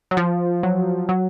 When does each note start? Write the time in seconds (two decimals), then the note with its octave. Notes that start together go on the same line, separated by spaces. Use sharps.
0.11 F#3
0.17 F3
0.63 F#3
1.09 F#3